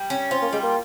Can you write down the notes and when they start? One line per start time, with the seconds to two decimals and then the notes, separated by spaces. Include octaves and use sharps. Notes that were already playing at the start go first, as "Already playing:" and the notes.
Already playing: G3
0.10 C#4
0.31 C4 F4
0.42 A#3
0.52 G3 G#3
0.63 A#3